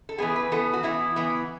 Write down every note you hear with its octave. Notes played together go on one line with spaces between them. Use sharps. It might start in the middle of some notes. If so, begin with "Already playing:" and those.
A4
E3 B3 G#4
B4
E3 B3 A4
F#4
E3 B3 E4
E3 B3